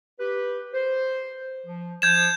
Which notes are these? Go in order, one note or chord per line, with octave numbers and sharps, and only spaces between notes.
G4 B4
C5
F3
F3 G6 G#6 E7